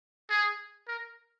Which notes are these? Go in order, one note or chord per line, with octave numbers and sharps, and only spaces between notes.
G#4
A#4